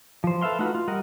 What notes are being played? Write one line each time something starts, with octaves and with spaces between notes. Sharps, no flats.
F3 C5
A4 B4 E5 F5 C6
A3 D#4 F4 F#4 B4
F4
G3 A#4 D#5 F#5